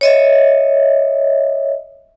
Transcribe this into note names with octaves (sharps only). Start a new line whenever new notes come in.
C#5 D#5 E5